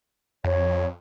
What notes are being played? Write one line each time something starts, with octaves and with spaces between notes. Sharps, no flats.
F2 C#5